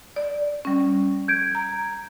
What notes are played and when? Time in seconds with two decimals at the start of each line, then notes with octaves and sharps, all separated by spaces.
0.16 D5
0.65 G3 C#4
1.28 G6 G#6 D7
1.55 A#5